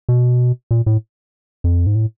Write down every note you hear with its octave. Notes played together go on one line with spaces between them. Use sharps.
B2
A#2
A2
F2
G#2
A2